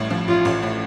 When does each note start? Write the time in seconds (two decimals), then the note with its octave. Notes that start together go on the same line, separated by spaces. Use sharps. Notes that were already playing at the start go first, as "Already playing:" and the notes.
Already playing: A1 A2 G3
0.10 F3
0.28 A1 F4
0.45 A1
0.62 A2